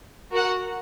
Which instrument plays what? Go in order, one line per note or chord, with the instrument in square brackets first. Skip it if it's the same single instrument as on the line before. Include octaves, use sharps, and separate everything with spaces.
[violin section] F#4 A#4 F#5